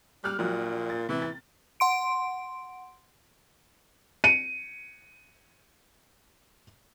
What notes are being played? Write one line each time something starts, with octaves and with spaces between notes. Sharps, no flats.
G3 F6 F#6
A#1 A#2 F#3
A6
C3 E3
A6
F#5 C6 D7
C#7 D#7